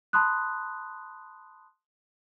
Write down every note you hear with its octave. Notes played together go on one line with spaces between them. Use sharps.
A5 B5 C6 D#6 F#6